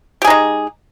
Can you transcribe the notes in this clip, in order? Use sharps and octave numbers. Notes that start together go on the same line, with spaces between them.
G#3 D#4 G4 G#4